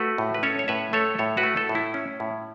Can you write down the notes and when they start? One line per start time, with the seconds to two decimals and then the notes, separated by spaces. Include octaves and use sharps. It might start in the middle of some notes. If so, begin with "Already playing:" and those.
Already playing: A3 F#4 B4
0.18 A2
0.34 B4
0.43 C#4 A4 C#5
0.59 C#5
0.68 A2 B4 E5
0.93 A3 A4 C#5
1.18 A2 A4 C#5
1.37 F#4 B4
1.43 A3
1.56 E4 A4
1.69 A2
1.75 E4
1.94 C#4
2.20 A2